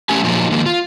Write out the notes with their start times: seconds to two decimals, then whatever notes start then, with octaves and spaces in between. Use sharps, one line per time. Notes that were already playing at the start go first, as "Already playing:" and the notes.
0.09 E2 A2 A3 C#4 G4 G#5
0.24 A#2 F3 F#3 D#4 G4
0.51 D#3 F3 G#3 A#3
0.66 F4